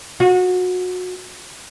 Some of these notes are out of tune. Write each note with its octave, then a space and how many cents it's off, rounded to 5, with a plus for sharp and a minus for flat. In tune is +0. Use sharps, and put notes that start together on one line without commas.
F#4 -25